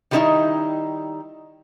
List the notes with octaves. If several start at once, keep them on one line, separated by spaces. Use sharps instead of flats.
D#3 G3 G#3 C4 D#4 E4